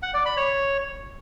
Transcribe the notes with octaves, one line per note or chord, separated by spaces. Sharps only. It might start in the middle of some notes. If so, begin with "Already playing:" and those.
F#5
D5
B5
C#5